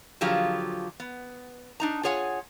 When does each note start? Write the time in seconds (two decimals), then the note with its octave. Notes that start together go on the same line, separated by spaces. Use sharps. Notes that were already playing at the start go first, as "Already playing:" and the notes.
0.21 D3 F3 F#3 F4 G4 G#4
1.00 B3
1.80 D4 D#4 A#5
2.03 F4 G#4 C#5 F#5 G#5